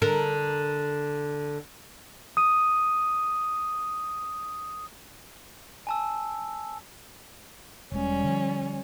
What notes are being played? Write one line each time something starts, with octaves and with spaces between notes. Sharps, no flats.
D3 A#4
D#6 D#7
G#5 A5 E6
E1 G3 G#3 C#4
D3 F3